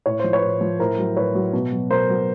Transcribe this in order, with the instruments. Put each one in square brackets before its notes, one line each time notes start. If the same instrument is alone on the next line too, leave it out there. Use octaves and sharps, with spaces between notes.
[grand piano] A2 C#5
F3 C5
B4 C#5
A2
F3
A2 A#4 C5
F#3
A2 B4 C#5
F#3
B2
F#3
B2 A#4 C5
F#3